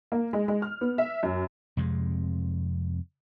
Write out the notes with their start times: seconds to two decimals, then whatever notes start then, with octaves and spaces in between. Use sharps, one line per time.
0.12 A#3
0.33 G#3
0.48 G#3
0.62 F6
0.81 B3
0.98 E5
1.23 F#2
1.77 F2 C3 G#3